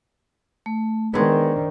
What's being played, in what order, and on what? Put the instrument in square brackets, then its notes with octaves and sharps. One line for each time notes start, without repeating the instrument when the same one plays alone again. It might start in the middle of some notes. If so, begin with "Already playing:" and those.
[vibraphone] A3
[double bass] D#3 [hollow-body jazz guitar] G#3 B3 [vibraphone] D4 C5 D5